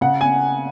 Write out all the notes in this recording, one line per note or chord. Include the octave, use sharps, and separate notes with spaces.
C#3 F#5
G#5